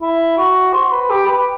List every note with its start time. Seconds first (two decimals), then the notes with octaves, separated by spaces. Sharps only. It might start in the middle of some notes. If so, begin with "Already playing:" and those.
0.02 E4
0.38 F#4
0.73 C5
0.91 B4
1.10 G4
1.27 B4